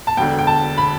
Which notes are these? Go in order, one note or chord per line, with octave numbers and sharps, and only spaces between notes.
A5
E1 D2 D3 G5
G5
A5
B5